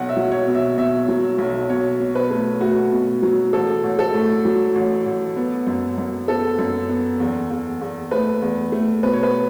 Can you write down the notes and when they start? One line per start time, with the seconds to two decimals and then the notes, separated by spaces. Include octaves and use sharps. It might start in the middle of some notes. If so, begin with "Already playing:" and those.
Already playing: B1 F#5
0.09 E5
0.16 F#3
0.31 C#5
0.47 B2
0.54 E5
0.78 B2 E5
1.08 F#3
1.38 B1
1.69 B2 C#5
2.00 B2
2.15 B4
2.31 A3
2.61 A3 F#4
2.92 B2
3.22 F#3
3.53 A1 A4
3.83 A1
3.99 A4
4.14 A2
4.45 F#3
4.75 A1
5.06 A1
5.36 B3
5.67 F#2
5.98 F#2
6.28 B3 A4
6.59 F#2
6.89 B3
7.20 E2
7.50 E2
7.81 E2
8.11 A3 B4
8.42 E2
8.72 A3
9.03 B2 B4
9.13 C#5
9.23 B4